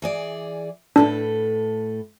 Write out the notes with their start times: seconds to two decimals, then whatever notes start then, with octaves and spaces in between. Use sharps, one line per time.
0.02 E3 G#4 D5
0.96 A2 D4 A4 B4